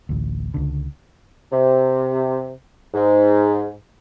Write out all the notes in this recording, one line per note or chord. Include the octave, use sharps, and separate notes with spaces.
A1 D2
C#2 D3
C3
G#2